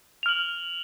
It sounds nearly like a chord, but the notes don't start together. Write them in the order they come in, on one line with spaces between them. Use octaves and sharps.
F7 F6 F#7